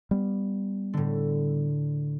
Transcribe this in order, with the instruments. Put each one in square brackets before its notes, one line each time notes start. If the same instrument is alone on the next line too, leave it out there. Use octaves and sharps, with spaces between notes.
[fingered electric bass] G3 B3
[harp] A2 D3